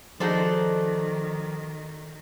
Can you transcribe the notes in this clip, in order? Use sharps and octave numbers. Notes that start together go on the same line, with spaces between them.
D#3 F3 D#4 F#4 G#4 A4 C5 D5